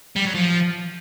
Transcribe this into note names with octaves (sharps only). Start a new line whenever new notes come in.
G3
F#3
F3